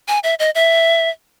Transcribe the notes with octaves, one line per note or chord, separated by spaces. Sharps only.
G#5
E5
D#5
E5